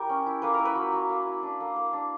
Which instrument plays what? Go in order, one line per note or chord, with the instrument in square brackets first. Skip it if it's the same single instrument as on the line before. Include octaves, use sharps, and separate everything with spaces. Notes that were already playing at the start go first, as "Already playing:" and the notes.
Already playing: [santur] G3 E4 G4 A#4
C#4
E4
A#3 B4
E4 A#4
B4
F#3
F#3
A#3
E4
D4
A#3
A#3
D4